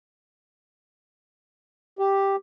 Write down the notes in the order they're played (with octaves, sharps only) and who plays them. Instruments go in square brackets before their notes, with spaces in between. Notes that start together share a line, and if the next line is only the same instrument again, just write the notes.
[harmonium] G4